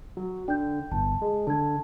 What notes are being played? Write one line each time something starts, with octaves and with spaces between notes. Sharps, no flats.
F#3
D3 G5 G6
G1 A5
G#3
D3 A5 G#6